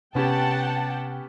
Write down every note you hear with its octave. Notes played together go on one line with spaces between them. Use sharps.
C3 B3 C#4 G4 F#5 G5 A5